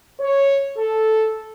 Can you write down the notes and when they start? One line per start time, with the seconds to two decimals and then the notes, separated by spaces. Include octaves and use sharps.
0.19 C#5
0.76 A4